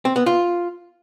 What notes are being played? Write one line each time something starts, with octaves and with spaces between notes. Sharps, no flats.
C4
B3
F4